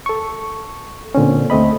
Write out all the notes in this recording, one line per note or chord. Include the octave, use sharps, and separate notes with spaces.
A4 C#6
A#2 D3 C4 C#4
D2 A3 C4 D#5 B5